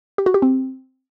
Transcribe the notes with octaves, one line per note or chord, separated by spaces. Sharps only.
G4
F#4
G4
C4